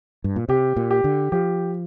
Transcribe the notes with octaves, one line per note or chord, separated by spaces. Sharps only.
G2
A#2
C3 G4
A#2
G4
D3
F3 G4